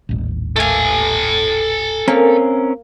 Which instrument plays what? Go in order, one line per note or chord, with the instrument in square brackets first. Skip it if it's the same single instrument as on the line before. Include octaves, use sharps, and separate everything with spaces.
[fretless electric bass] D#1 A1
[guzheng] A3 F5 [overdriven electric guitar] A4 G#5
[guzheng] A#3 [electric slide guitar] C4 C#4 A#4